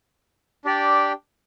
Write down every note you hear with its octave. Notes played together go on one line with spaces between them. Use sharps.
D4 G4 D5 G5